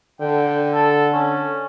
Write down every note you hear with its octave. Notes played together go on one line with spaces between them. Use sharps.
D3 G5
A4
C#4